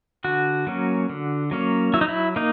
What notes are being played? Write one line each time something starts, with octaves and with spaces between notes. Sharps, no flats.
D3 F#4
F#3 A#3 C#4
D3
F#3 A#3 C#4
F#3 E4
D#4
E4
A#3 D#4